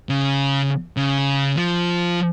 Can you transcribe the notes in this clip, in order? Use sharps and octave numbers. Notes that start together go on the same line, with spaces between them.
C#3
C#3
F3